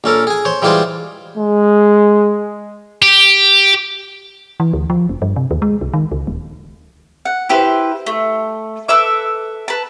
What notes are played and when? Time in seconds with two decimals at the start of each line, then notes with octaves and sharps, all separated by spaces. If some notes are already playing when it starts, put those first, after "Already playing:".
0.04 A#1 C#4 A4 A#4
0.27 G#4 G#5
0.45 C5 C#5
0.62 E3 G3 G#3 F4 G#4 C5
1.37 G#3
3.02 G4
4.60 E3
4.73 D2
4.90 F3
5.09 F1
5.22 G2
5.36 C3
5.51 D#2
5.62 G#3
5.81 C2
5.94 D#3
6.12 C#2
6.27 D#1
7.25 F#5
7.49 E4 G4 B4 C5
8.06 A3
8.88 A4 B4 E5 D6
9.68 B4 A5